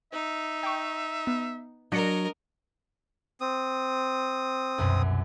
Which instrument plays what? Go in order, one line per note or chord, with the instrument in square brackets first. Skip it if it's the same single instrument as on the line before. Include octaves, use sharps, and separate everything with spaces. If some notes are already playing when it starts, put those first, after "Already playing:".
[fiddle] D#4 [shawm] E5
[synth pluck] G5 C#6
B3
[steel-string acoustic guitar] F#3 [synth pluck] D4 A#6 C#7 [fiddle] A#4 D#5
[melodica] C4 D#6
[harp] C2 F#2 B2